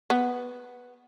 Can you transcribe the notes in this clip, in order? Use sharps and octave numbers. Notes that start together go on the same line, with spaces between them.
B3